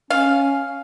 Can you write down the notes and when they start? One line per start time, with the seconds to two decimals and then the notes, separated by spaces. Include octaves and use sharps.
0.10 C#4 F5